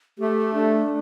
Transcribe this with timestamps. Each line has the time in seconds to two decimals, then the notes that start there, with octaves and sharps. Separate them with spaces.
0.19 A3 G4
0.54 D4